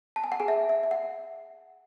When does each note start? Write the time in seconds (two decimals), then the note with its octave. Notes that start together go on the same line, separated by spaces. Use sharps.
0.16 A5
0.24 G#5
0.32 F#5
0.40 G#4 G#5
0.48 E5
0.69 E5
0.83 E5
0.91 F#5